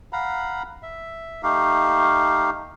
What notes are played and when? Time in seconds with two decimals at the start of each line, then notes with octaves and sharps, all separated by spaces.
0.13 F5 F#5 A#5 B5
0.83 E5
1.43 A3 D#4 G4 F5